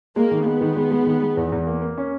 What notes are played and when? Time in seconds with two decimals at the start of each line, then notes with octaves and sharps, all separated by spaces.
0.16 G#3 A#3
0.31 D#3
0.46 G#3 B3
0.61 D#3
0.76 G#3
0.91 G#3
1.06 D#3
1.22 G#3
1.37 E2
1.52 E2
1.67 A#3
1.82 A#3
1.98 C#4